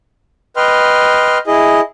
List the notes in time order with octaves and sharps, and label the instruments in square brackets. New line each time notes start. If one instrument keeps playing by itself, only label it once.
[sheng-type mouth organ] B4 D#5 G5 C6 F6
E4 G#4 D#5